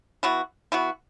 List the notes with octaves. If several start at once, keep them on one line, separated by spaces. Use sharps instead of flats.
E3 B3 F#4
E3 B3 F#4